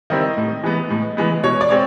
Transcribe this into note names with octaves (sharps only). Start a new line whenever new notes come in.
D#3 G3 C4 E4 D#5
A2
E3 G#3 B3
A2
E3 G#3 B3
B2 C#5
D5
G#3 C4 C#5